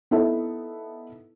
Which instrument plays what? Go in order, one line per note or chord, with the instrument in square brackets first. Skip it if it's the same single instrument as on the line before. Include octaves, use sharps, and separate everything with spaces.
[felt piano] B3 D#4 E4 A4 E5